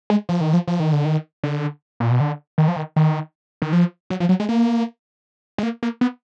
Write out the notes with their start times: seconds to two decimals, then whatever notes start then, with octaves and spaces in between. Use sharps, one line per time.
0.10 G#3
0.29 F3
0.41 D#3
0.53 F3
0.68 F3
0.80 D#3
0.93 D3
1.05 D#3
1.43 D3
2.00 A#2
2.11 B2
2.20 D3
2.58 D#3
2.68 F3
2.76 D#3
2.96 D#3
3.62 D#3
3.73 F3
4.10 F#3
4.20 F3
4.29 F#3
4.40 G#3
4.49 A#3
5.58 G#3
5.63 A#3
5.83 A#3
6.01 B3